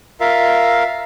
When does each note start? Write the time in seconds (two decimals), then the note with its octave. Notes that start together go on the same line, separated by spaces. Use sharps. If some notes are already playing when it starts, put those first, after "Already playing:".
0.20 F4 A#4 E5 F5